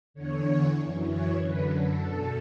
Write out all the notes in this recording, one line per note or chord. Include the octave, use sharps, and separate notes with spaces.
E2 D3 C#5
F#2 E3
C#5
F#2 D3 B4
A4
E2 B2